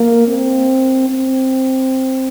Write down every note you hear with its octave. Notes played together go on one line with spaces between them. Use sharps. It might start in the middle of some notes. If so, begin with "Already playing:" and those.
Already playing: A#3
C4
C4